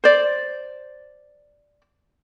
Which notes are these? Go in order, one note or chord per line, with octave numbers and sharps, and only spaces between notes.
C5 D5